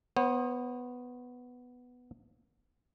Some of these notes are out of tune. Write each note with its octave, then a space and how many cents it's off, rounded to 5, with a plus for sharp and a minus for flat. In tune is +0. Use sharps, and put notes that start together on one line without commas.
B3 +0 C5 +40